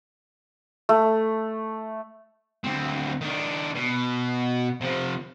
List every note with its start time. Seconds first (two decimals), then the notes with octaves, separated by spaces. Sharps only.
0.89 A3
2.64 D2 C4
3.21 D#3 D4
3.75 B2
4.81 C3 F3